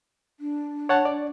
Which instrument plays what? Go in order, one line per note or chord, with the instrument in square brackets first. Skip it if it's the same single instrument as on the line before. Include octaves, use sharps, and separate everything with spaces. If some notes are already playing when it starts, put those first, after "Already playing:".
[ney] D4
[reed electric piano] C#5 F#5 A5
D5